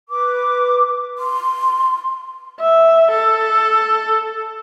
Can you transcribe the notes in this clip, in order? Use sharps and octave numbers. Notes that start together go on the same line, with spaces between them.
B4 D6
C6
E5
A4